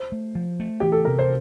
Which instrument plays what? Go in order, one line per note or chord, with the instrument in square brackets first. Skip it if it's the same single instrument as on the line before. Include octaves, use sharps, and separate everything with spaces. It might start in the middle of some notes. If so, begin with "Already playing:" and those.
Already playing: [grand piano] C5
[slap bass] A3
F3
A3
[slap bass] E3 [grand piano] G4
[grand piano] A4
[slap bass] C3 [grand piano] A#4
[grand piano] C5